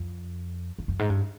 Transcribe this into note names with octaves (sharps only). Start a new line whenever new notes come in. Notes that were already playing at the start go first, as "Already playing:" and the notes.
Already playing: F2
F2
F#2
G#2
G2